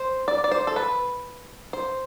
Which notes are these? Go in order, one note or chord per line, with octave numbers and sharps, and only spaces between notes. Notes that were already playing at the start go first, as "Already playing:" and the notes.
Already playing: C5
D5
D5
C5
A4
B4
C5